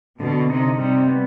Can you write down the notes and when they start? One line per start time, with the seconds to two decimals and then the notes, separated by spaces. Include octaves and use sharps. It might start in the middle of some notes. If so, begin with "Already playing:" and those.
0.20 B2 D3
0.49 C3 D#4
0.79 C3 G3
1.08 B3